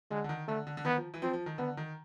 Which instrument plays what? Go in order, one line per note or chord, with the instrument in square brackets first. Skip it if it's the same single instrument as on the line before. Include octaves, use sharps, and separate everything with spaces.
[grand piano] D3 [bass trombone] G#3
[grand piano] D3
D#3
[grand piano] D3 [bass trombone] A3
[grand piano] D3
D3
[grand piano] D#3 [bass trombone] B3
[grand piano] F3
E3
[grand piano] F3 [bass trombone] C4
[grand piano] F3
D#3
[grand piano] D3 [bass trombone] B3
[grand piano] D#3